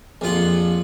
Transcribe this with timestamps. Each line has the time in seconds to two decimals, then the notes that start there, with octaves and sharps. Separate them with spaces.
0.21 A#1 F2 F4 F#5